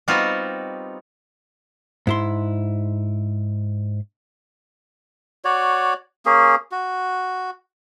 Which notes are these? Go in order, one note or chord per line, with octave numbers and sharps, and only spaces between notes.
G3 B3 C4 D#4 F4 F#4
G#2 E4 C6
F#4 C#5 D5
A#3 C#4 G#4
F#4